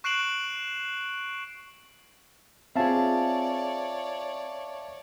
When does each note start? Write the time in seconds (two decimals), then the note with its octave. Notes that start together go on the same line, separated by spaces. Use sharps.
0.04 C#6 F#6 C7 D7 E7 F#7
2.76 C4 F4 G#4 C#5 D5 E5 F5 A5